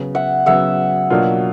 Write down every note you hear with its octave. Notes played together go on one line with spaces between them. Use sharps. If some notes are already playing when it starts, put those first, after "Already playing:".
Already playing: C#3 F#3 B3
E5 F#5
C#3 F#3 B3 E5 F#5
B2 F#3 A#3 D4 F4